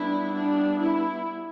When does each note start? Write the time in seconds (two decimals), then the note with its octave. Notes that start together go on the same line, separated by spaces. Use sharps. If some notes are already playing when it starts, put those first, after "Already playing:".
Already playing: G3 B3 D4 E4
0.32 D4
0.79 E4